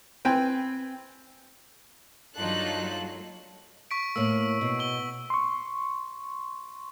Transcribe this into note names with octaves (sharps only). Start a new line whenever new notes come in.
C4 B4 G5 G#5
G2 F#3 A#3 D4 D#4 F4 A4 F#6
C#6 B6 D7
A2 A#3 E6
B2
C#6 G7
C6 C#6